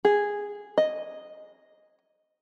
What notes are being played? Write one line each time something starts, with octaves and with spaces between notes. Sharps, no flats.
G#4
D#5